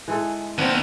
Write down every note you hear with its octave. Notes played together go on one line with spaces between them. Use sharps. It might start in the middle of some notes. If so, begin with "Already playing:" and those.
E3 G#3 A4
D#2 B3 C4 D4 C5